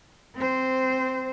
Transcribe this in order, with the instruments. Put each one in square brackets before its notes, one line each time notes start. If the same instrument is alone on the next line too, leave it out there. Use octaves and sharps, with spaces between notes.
[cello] C4 C5